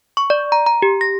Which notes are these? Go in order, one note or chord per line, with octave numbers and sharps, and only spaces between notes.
C#6
D5
A#5
A#5
G4
A#6